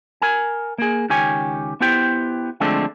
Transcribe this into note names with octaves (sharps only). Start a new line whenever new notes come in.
A#4 G#5
A#3 G#4
C#2 D#3 G4 C#5 G#5
B3 E4 G4 C5 G5
D3 F3 G#3 A3 C4 D4